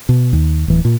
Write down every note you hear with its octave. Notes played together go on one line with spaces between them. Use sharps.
B2
D#2
D1 E3
A#2